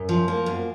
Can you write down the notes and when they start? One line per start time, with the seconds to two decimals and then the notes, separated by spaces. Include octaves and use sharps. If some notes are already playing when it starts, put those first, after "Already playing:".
Already playing: F#2
0.09 F3
0.28 A#3
0.46 F#2